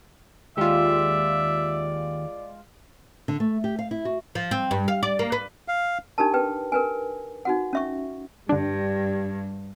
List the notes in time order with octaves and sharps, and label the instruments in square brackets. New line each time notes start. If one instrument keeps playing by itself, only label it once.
[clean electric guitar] D#2 G4 [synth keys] G#3 F4 [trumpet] D5 [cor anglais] E5
[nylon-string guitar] D3
A3
G4
F5
E4
F#4
[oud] F3
C4
G2
F5
D5
A#3
B4
[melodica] F5
[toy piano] D4 D#4 G4 A#4 A5
B4 G5
A#4 B4 G#5
D#4 F#4 F#5
C#4 E5 C#6
[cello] G2 [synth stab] D3 D4 [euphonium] G3